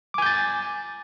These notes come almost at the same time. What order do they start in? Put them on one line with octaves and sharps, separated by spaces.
D6 G#5 G6 A6